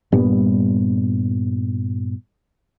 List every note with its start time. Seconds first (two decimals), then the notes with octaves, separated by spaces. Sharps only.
0.12 G2 A#2 G3 B3